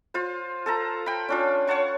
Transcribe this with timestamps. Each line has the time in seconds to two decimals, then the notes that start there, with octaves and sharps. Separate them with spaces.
0.14 F4 C5
0.66 A4 A5 A#5
1.06 G5 B5
1.29 C#4 D4 F4
1.67 C#5 F#5 A5 C#6